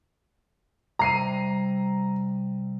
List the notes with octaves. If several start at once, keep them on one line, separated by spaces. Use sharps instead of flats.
C3 G3 A#5 C7 D#7